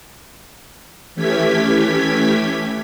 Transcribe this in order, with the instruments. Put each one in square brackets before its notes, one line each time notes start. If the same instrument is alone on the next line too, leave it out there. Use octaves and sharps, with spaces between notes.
[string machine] E3 A3 C#4 G4 G#6 B6